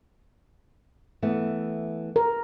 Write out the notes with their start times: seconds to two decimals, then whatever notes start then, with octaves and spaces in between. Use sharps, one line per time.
1.22 E3 A3 B3
2.16 A#4